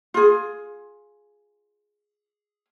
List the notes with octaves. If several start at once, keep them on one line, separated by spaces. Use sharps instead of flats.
F4 G#4